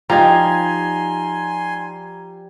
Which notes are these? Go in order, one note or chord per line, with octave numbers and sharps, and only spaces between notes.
F3 G3 D#4 G#5 A#5 C6 G#6